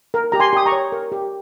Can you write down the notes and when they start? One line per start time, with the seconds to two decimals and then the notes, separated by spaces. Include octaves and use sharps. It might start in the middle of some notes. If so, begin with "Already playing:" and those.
0.14 A#4
0.32 G4 A#5
0.40 G#5 C6
0.53 G4 D#6
0.66 A#5 C#6
0.72 C#5
0.92 A#4
1.12 G4